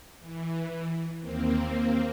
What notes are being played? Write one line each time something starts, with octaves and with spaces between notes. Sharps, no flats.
E3
D#2 A#3 C4